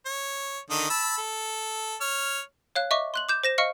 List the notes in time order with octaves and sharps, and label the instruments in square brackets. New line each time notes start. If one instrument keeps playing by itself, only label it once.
[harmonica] C#5
D3 D#3 D#5
A5 B5 E6
A4
C#5 F6
[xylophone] C#5 F5 F#6
D#5 E5 C#6 D6
C6 F#6 F#7
D6 G6 E7
C5 A#6 E7
D#5 F5 C#6 F6 C#7